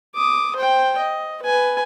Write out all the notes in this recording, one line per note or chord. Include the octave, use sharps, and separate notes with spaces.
D6 D#6
C5 G5
D#5
B4 G#5